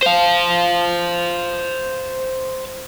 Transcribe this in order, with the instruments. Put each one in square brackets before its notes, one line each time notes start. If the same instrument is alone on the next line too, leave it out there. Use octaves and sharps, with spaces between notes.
[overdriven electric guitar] C5 F5